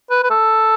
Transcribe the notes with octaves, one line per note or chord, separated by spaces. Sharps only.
B4
B4
A4